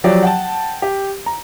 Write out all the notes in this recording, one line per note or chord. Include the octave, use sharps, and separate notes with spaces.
F3 F#3 G4 D5
F#5 G5 A5
G4
A#5